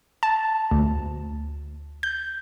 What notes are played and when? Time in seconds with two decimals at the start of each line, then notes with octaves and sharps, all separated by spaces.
0.23 A5
0.71 D2
2.03 G6